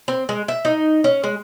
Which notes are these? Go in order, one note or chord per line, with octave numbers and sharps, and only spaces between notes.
C4
G#3
E5
D#4
C#4
G#3